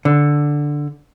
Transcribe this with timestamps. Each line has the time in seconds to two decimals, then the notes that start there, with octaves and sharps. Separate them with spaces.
0.05 D3